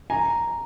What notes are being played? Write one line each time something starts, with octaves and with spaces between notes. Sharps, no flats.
G#5 A#5